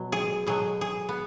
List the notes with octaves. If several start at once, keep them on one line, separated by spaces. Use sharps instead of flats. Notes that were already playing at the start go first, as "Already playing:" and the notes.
Already playing: B2 F#3
G#4
B2 F#3 G#4
G#4
B3